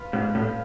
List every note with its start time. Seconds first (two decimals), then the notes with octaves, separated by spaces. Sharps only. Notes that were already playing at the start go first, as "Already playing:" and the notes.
Already playing: F4 B4 F5
0.13 G#2
0.35 A2